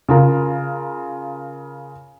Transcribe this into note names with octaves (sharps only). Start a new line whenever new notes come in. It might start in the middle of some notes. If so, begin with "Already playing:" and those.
C#3 F4 A#4